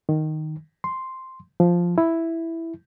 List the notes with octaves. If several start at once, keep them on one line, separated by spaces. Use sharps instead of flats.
D#3
C6
F3
E4